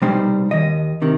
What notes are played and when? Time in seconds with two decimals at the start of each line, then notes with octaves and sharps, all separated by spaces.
0.02 C2 B2 G3 D#4 C5
0.51 D#2 D#3 D#5
1.02 C3 D#3